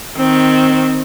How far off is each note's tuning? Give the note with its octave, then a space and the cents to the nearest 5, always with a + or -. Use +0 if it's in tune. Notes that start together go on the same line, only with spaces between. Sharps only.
D#3 +0 C4 +0